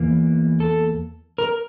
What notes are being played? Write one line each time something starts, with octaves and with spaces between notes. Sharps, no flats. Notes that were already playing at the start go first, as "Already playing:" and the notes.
Already playing: E2 E3 A#3
A4
A#4